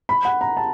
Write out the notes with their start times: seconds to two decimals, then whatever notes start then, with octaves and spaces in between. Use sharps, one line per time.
0.09 B5
0.25 F#5
0.41 A#5
0.57 A5